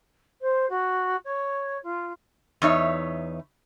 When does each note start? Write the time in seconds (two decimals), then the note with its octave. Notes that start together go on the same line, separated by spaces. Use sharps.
0.41 C5
0.69 F#4
1.24 C#5
1.83 F4
2.62 E2 D#4 C#5 E5